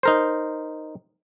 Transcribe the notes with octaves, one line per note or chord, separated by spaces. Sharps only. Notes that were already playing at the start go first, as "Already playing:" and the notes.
D#4 A#4 C5